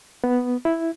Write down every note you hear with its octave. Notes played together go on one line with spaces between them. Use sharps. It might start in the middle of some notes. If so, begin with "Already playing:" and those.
B3
E4